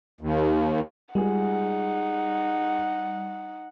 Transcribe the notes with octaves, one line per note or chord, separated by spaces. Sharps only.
D#2
G3 G#3 D#4 F4 G#4 F#5